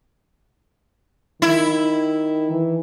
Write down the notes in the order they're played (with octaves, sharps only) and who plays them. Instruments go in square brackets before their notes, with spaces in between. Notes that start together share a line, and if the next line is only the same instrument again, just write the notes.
[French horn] D#3 [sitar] E4
[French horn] E3